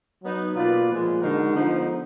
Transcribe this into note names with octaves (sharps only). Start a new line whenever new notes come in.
F#3 B3 D#4
B2 A#3 F4 B4 D5
A#2 F3 G#3
D3 G#3 D#4 F#4 A#4
D3 F3 B3 D#4